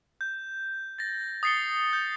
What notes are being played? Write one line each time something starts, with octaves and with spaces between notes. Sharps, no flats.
G6
A6 A#6
D#6 A6 C7 C#7 G7
G6